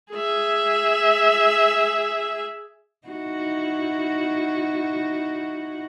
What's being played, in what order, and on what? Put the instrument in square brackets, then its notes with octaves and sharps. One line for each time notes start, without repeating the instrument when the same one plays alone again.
[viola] G#4 E5
[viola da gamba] D#4 E4 F#4